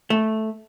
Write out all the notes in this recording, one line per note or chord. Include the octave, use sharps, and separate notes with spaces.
A3